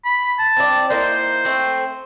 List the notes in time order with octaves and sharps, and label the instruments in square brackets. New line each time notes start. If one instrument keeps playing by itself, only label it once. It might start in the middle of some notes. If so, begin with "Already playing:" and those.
[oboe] B5
A5
[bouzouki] C4 E4 D5
[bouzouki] A#3 D#4 E4 [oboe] C5
[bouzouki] A3 C4